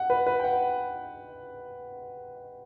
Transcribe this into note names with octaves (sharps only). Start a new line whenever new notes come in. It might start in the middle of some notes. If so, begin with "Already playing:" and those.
Already playing: F#5
B4
B4
G5
F#5